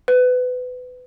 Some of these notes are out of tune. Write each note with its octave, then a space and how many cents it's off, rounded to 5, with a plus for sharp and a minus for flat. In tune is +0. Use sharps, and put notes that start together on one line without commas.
B4 +25